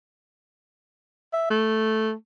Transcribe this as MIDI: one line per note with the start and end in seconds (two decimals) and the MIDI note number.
1.33 1.49 76
1.50 2.13 57